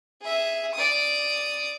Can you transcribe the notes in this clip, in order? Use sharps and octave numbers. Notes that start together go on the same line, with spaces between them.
G#4 E5
D5 D#6